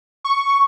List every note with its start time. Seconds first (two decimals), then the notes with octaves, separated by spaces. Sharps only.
0.24 C#6